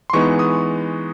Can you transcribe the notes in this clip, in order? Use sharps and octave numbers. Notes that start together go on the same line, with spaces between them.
C6
E3 G#3 B3 D#4 C#6
D#6